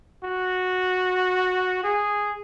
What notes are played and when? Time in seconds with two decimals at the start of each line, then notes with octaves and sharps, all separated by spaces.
0.24 F#4
1.84 G#4